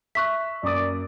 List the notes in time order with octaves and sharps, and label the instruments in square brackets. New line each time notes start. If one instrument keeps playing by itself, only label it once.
[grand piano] E5 E6 F#6 [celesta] C#6 B6
[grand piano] F#2 A#3 D#6 [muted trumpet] D5